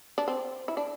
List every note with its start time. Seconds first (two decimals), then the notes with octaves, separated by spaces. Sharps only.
0.18 D4
0.28 C4
0.68 E4
0.77 D4